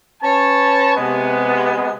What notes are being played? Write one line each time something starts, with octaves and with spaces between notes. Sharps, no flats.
C#4 B4 C#5 A5
C3 G#3 B3